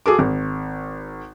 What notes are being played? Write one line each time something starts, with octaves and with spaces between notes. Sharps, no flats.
F#4 G#4 A4 D6
G#1